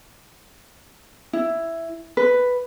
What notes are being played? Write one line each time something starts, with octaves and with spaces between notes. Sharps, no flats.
E4
B4